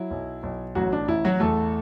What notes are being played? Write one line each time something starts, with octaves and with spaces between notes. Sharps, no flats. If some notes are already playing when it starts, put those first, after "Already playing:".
Already playing: F#3 E4
B1
B1
A1 F#3 F#4
D4
A1 E4
F#3 F#4
E2 A3 A4